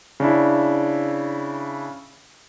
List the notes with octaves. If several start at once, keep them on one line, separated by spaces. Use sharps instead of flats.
C#3 D4 E4